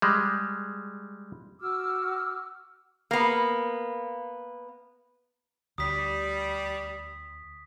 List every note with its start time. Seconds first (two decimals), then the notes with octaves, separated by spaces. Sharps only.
0.02 G3 G#3
1.61 F#4 D6 E6 F6
3.11 A#3 B3
5.78 D2 G3 D#6 B6